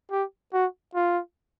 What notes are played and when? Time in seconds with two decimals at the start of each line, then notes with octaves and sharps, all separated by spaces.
0.11 G4
0.53 F#4
0.95 F4